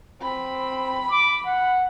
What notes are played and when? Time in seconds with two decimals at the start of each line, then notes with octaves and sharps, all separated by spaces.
0.22 C4 B5
1.11 D6
1.45 F#5